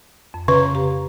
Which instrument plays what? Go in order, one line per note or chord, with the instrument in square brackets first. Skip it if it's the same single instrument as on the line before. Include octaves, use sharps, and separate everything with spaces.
[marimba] F2
[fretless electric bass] C#3 [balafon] B4 [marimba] A#5 C6 [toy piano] C#6
[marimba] G4 F5 A#5